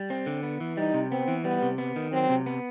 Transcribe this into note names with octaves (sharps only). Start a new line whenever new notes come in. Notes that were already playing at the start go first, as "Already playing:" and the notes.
Already playing: G3
C4
D3
B3
E3
G3 D#4
C3
B3 C4
E3
G3 B3
C3
B3
D#3
F#3 C4
C3
B3